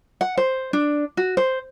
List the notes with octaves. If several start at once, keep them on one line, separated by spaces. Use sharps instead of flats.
F#5
C5
D4
F#4
C5